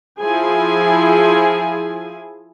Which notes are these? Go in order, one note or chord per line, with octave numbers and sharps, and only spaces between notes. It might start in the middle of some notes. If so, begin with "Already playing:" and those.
F3 E4 G#4 G#5